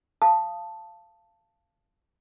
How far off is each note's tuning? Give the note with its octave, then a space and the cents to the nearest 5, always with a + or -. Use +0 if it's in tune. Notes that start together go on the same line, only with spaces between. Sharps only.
F5 -20 A5 +0 D#6 +0